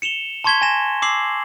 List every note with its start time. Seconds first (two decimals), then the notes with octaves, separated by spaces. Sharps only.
0.02 C#7 E7 F7 G7
0.44 A5 C6 C#6 G#6 B6 G7
0.62 G#5 A#6 E7
1.02 D6 E6 C7 F#7